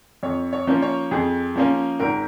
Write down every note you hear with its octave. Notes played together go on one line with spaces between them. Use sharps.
F2 C#5
C#5
F3 A#3 C#4
C#5
F2 G#4
F3 A#3 C#4
G#1 A#4